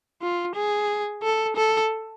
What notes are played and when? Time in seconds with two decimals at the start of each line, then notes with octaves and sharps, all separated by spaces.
0.22 F4
0.55 G#4
1.23 A4
1.56 A4